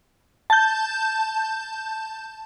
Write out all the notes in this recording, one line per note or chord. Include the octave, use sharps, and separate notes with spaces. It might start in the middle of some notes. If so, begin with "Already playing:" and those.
A5 G6